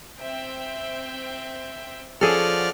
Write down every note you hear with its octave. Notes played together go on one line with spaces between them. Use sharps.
C4 E5 G5
F3 C#4 G#4 A4 D5 F#5 F6